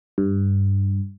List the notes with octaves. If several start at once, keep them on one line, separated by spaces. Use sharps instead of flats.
G2